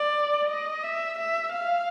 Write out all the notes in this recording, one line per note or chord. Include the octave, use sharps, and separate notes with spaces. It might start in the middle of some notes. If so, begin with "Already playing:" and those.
Already playing: D5
D#5
E5
E5
F5